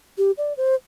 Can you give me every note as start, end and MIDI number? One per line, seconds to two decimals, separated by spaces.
0.18 0.31 67
0.38 0.53 74
0.57 0.75 72